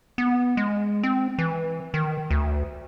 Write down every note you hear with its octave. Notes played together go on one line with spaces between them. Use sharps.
B3
G#3
C4
E3
D#3
D2